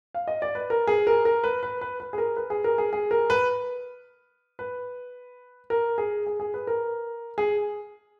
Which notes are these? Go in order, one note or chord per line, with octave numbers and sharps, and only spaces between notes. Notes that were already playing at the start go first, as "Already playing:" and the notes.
F5
D#5
D5
B4
A#4
G#4
A#4
A#4
B4
B4
B4
B4
G#4
A#4
B4
G#4
A#4
G#4
G#4
A#4
B4
B4
A#4
G#4
G#4
G#4
B4
A#4
G#4